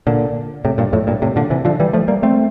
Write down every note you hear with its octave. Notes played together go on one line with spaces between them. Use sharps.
A#2 D3
A2 C3
G2 A#2
F2 A2
G2 A#2
A2 C3
A#2 D3
C3 E3
D3 F3
E3 G3
F3 A3
G3 A#3
A3 C4